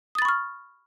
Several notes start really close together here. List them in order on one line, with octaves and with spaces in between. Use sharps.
D#6 A6 B5 C#6 F6